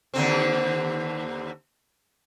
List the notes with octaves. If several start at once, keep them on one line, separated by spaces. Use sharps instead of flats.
D#2 D3 C4